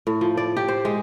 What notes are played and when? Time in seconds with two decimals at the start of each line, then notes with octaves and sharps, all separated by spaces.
0.07 A2
0.21 F3
0.37 D5
0.57 G4
0.68 C5
0.85 G#3